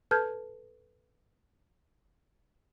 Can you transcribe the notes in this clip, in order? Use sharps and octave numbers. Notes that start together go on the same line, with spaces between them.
A4 B4 A5 F6 G6 G#6